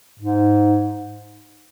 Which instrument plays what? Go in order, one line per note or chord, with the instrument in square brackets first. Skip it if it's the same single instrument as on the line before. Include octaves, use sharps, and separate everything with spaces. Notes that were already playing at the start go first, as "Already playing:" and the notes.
[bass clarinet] G#2